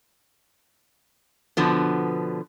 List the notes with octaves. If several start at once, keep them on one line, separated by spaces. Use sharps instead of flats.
B2 D3 F3 B3